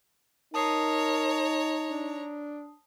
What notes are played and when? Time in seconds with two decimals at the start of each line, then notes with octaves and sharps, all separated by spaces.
0.54 D#4 A#4 C#5 A5 A#5 D#6 C7
1.90 D4